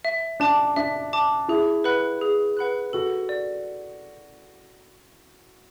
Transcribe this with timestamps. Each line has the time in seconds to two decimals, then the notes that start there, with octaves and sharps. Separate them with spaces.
0.05 E5
0.40 D4 A5 D6
0.76 D4 E5
1.13 A5 D6
1.48 E4 G#4
1.84 B4 F#5 B5 F#6
2.21 G#4
2.57 B4 F#5 B5 F#6
2.93 F#4 A4
3.29 D5